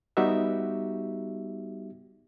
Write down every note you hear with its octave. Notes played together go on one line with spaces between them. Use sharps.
G3 B3 D#4 F#4 G4 E5